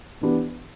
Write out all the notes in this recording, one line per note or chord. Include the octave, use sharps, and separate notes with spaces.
E3 B3 D4 G4